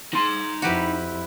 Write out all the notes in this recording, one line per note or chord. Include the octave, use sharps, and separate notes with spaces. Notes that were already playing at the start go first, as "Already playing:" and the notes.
D#4 C6
F2 E4 F#4 G4 B4